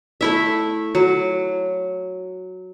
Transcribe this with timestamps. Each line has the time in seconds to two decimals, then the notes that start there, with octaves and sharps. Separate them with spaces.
0.21 A3 E4 E5
0.95 F#3